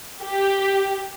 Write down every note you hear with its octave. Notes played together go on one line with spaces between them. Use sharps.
G4